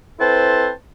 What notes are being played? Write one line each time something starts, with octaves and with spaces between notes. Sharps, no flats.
C4 E4 A4 B4 C5 A5